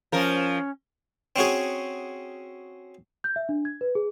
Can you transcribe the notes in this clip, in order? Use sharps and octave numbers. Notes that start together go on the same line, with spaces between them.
F3 C#4 A#4
C4 C#4 F#4 G#4
G6
E5
D4
G#6
B4
G#4